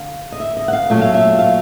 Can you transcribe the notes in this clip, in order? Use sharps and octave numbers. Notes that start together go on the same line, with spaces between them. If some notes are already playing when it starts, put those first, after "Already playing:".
Already playing: D3 F5
D#5
E5
D#5
F#5
F5
A#2 F#3 A3 E5
F5
E5
F5